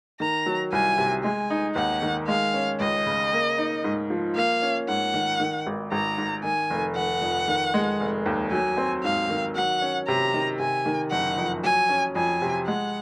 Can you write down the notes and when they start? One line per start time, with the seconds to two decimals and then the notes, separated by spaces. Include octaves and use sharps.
0.20 D#3 A#5
0.46 F#3
0.72 C2 G#5
0.98 C3
1.24 G#3 G#5
1.50 D#4
1.76 D#2 F#5
2.02 D#3
2.28 G#3 F5
2.54 C#4
2.80 C#2 D#5
3.06 C#3
3.33 A#3
3.58 D#4
3.84 G#2
4.10 F3
4.35 A#3 F5
4.62 C#4
4.88 G#2 F#5
5.14 D#3
5.40 D#3
5.67 G#1
5.92 G#1 A#5
6.18 G#2
6.43 D#3 G#5
6.70 F1
6.96 F1 F#5
7.22 F2
7.48 D#3
7.74 G#3
8.00 F1
8.26 D#2
8.52 F#3 G#5
8.77 C4
9.04 G#2 F5
9.29 D#3
9.56 F#3 F#5
9.82 C#4
10.08 C3 A#5
10.34 D#3
10.59 C3 G#5
10.86 D#3
11.12 F#1 F#5
11.38 F2
11.64 F#3 G#5
11.89 C#4
12.15 F2 G#5
12.42 C3
12.67 G#3 F#5